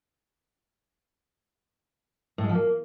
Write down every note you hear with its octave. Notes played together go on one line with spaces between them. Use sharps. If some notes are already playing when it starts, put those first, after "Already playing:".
A2
G#3
F3
A#3